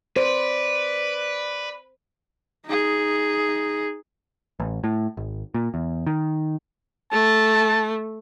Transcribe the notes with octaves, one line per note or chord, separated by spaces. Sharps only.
B4 C5 D5
D#4 G#4
A1
A2
G#1
A#2
E2
D#3
A3 A5